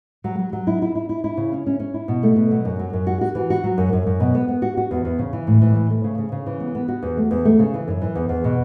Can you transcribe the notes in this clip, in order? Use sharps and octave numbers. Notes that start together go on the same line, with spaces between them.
F#3
F#3
F#3
E4
E4
E4
E4
E4
C#3
C#4
C#4
C#4
E4
B2
A3
B2
F#3
F#2
F#3
F#2
F#4
F#4
E3
F#4
F#3
F#2
F#2
F#2
B2
B3
B3
F#4
F#4
E2
E2
C#3
E3
A2
E3
A2
A3
C#3
C#3
C#3
E3
B3
B3
F#4
E2
A3
E2
A3
C#3
E3
F#2
E3
E2
E2
B2